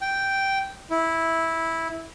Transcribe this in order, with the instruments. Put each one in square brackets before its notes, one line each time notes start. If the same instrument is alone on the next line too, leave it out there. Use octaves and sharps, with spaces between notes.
[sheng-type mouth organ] G5
E4